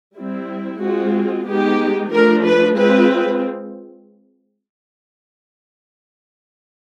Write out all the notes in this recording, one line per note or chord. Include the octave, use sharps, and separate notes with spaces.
G3 C4 E4
G#3 C4 F4 F#4
G#3 B3 D#4 G4
F3 A3 D4 A#4
B4
G#3 C4 F4 B4